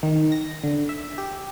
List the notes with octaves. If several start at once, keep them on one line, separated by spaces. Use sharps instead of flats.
D#3
A#6
D3
E5
G4